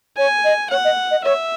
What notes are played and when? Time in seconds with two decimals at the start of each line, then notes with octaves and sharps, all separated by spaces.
0.17 C#5 G#5
0.44 D#5
0.70 C#5 F#5
0.84 D#5
1.10 D#5
1.24 C#5 E5